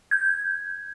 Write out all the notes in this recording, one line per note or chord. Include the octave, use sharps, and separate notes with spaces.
G6 G#6